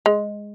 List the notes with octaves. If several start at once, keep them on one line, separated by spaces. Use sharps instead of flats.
G#3